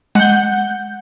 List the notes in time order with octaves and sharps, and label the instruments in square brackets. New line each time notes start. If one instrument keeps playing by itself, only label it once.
[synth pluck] G#3 [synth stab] F#5 G6